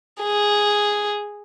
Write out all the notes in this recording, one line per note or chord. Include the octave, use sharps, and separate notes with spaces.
G#4